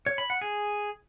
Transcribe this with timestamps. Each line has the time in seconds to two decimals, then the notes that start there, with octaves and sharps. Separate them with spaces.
0.06 C#5
0.18 B5
0.30 F#5
0.41 G#4